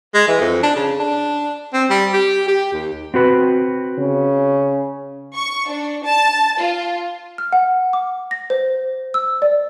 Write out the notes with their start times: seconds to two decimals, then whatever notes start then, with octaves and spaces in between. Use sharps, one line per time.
0.15 G#3
0.28 E3
0.41 F2
0.63 D4
0.76 C#3
0.99 D4
1.74 C4
1.90 G3
2.13 G4
2.48 G4
2.73 D#2
3.14 C4 F#4 B4
3.98 C#3
5.34 C#6
5.69 D4
6.04 A5
6.59 F4
7.38 F6
7.53 F#5
7.93 D6
8.31 A#6
8.50 C5
9.14 E6
9.42 D5